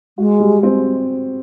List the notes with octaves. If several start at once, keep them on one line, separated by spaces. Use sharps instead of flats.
G#3 F#4
G3
C4